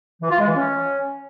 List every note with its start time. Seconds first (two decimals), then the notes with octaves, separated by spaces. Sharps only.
0.21 E3
0.30 F4
0.38 G#3
0.47 E3
0.56 C#4